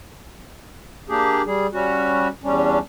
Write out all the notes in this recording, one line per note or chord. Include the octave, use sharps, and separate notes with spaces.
A#3 D4 G4 G#4
G3 G#4
G3 C#4 F#4
E2 G3 C#4 D4